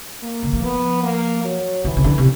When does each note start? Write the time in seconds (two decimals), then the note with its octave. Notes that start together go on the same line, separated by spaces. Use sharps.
0.22 A#3
0.43 D3
0.53 E3
0.63 F3 B3
1.03 A#3
1.44 F#3
1.84 D#3 E3
1.97 C#3
2.04 D3
2.18 C3